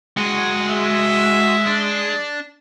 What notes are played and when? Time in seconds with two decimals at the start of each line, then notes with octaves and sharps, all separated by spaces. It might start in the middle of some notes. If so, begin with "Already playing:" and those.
0.17 G#3 F#4 G#4
0.71 E5
1.66 D4